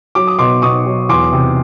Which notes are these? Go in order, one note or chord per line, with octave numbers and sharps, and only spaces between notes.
F#3 D6
D#6
B2 C6 D6
B2 C#6 D#6
F#3
E2 C6 D6
C3